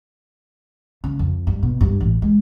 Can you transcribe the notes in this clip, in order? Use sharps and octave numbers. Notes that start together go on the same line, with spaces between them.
C#3
F2
G2
B2
G2
A1
G#3